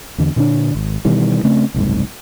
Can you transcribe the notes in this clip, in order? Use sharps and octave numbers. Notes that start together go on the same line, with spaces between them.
E2 D3
A#2 D3 C4 D4
G#1
B2 D#3 E3 G3
C#3 A3 C4
F#1 C2 G#2